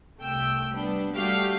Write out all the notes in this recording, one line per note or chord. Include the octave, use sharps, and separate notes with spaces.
C2 A3 G5 E6
G3 B3 D4
G3 A3 F#4 G4 F5 G5